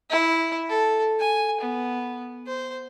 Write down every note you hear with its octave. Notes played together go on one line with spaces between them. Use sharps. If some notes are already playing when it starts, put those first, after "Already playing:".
E4
A4
G#5
B3
C5